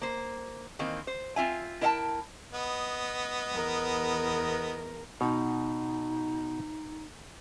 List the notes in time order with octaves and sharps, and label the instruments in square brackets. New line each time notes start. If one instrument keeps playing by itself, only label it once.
[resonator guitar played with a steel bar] A#3 C5
D#3 E3 A#3 C4
C5
C4 F4 E5 G#5
E4 A#4 D#5 E5 G5 A5
[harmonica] B3 D#5
[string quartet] E2 A#4
[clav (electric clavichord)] B2 [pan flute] D#4